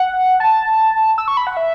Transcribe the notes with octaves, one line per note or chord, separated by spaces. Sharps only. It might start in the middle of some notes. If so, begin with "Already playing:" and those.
Already playing: F#5
A5
E6
C#6
B5
F#5
E5